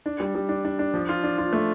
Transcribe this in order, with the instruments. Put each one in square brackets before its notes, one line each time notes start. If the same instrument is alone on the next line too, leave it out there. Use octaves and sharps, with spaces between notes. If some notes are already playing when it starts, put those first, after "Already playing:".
[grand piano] D4
G3
G3
D4
D4
D4
F3
F4
D4
F4
A3